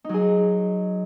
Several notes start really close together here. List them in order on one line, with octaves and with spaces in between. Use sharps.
D#4 F#3 G#4